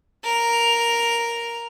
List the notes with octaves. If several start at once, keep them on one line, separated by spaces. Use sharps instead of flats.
A#4 F7